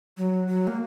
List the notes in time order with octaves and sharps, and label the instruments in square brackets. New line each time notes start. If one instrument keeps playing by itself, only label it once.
[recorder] F#3
F#3
A#3